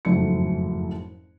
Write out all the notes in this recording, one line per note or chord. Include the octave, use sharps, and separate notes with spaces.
F#1 F2 G#2 F#3 A3 C#7